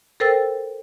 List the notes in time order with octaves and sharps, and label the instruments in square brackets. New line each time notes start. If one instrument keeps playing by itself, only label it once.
[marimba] A4 A#4 C5 G5 E6 A6